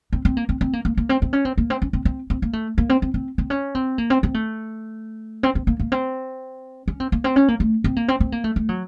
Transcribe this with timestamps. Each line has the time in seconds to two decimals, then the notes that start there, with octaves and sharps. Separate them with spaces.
0.13 C4
0.25 C4
0.37 A#3
0.49 C4
0.61 C4
0.73 A#3
0.85 A#3
0.97 A#3
1.09 C4
1.22 C4
1.33 C#4
1.45 C4
1.58 A#3
1.70 C4
1.82 C#4
1.93 C4
2.05 C4
2.30 C4
2.42 A#3
2.53 A3
2.78 A#3
2.89 C4
3.02 C4
3.14 C4
3.38 C4
3.50 C#4
3.75 C4
3.98 A#3
4.10 C4
4.23 C4
4.34 A3
5.43 C4
5.55 C4
5.67 A#3
5.80 A#3
5.92 C4
6.88 C#4
7.00 C4
7.12 A#3
7.24 C4
7.36 C#4
7.48 A#3
7.60 A3
7.84 C4
7.96 A#3
8.08 C4
8.20 C4
8.32 A#3
8.44 A3
8.56 A3
8.69 F#3